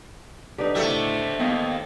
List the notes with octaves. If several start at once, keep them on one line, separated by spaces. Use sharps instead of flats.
D3 D#4 G4 B4
A2 A3 G4 C5 E5
D#2 B3 C4 D#5 F5